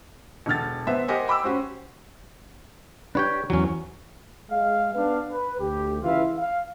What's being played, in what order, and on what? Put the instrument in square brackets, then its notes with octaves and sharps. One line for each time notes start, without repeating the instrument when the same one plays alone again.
[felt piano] E1 D3 F6 A6
B3 C5 E5
G4 A#4 C5 D#5 F#5 G#5
G5 B5 D6 E6
C#4 F#4 G4 C5
[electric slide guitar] D4 F#4 G4 [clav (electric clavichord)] B4 C#5 G5
[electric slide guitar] E2 E3 [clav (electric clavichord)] F#3 C#4
[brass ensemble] G#3 F5
B3 D4 F5
B4
D2 G4
C#2 E3 E4 F4 E5 F5
F5